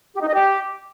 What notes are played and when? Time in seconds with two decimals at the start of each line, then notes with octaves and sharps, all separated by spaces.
0.14 G4
0.21 D#4
0.28 D#5
0.34 G4